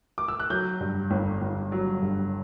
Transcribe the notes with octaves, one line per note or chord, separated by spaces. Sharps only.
D6
E6
F#6
F#3 G6
G2
G1
G1
F#3
G2